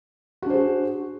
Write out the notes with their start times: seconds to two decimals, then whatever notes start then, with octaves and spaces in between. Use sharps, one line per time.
0.42 F#4
0.46 D4
0.50 C5
0.54 G#4